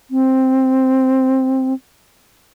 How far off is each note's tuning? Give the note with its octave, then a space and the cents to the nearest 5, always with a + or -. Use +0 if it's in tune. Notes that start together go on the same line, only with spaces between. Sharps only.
C4 +5